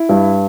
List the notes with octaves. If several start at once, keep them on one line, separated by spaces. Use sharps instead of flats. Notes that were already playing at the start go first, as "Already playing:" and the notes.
Already playing: E4
G2